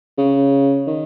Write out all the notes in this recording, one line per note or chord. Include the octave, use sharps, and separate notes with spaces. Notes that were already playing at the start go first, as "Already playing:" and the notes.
C#3
D#3